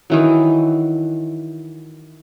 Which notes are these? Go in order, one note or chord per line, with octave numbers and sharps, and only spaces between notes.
D#3 E3 F#3